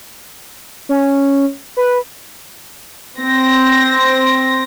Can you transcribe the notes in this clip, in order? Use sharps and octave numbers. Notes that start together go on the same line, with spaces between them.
C#4
B4
C4 A#6